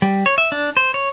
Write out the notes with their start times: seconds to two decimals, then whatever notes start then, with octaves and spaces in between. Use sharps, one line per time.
0.02 G3
0.26 C#5
0.38 E5
0.52 D4
0.77 C5
0.94 C#5